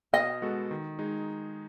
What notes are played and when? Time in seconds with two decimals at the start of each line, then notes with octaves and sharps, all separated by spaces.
0.13 B2 D#5
0.42 G#3 B3 F#4 A4
0.71 D#3
0.99 G#3 D#4 G#4